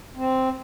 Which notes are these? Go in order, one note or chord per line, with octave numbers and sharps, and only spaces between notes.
C4